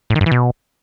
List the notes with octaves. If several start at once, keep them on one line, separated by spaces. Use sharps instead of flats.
A2
D#3
G2
E3
B2